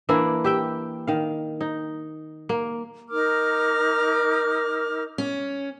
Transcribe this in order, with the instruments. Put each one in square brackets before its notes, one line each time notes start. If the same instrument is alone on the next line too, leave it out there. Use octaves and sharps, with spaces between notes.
[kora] E3 A#3 D4 E4
G4 E5 G5
D#3 F5
D#4
A#3
[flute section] D#4 A#4 D6 F6
[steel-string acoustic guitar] C#4